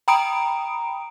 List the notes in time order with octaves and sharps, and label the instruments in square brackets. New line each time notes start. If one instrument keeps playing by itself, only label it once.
[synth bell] G5 A#5 B5 D#6 D7